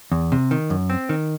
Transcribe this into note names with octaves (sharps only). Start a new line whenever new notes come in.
E2
C3
D#3
F#2
C4
D#3